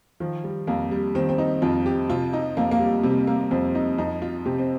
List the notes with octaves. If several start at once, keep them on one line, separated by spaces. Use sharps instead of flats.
D#3 F3
G3
F2 A#3
G3
D#3 C4
C4
D#4
F2 F4
G4
C3 F4
D#4
F2 A#3
A#3
G3
C3 G3
A#3
F2 C4
D#4
F2 D#4
F4
C3 G4
C4